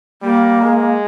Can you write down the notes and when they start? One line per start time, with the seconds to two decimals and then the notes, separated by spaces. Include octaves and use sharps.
0.22 G3 A#3
0.61 G#3